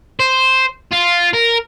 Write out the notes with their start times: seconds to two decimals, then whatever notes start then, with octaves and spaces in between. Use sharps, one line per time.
0.20 C5
0.92 F4
1.33 A#4